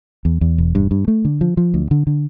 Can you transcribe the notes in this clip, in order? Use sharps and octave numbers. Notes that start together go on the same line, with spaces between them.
E2
E2
E1
G2
G2
A3
D3
F3
F3
D2
D3
D3